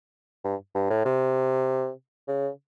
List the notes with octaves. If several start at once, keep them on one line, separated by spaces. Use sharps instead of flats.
G2
G2
A2
C3
C#3